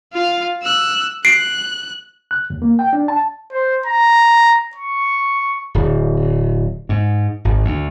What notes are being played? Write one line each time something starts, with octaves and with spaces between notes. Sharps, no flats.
F4 F5
E6 F#6
F#6 C7 D7
F#6
D#2
A#3
G5
D4
A5
C5
A#5
C#6
D1
G#2
G#1
D2